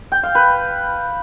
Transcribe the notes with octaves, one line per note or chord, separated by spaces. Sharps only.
G5
F5
B4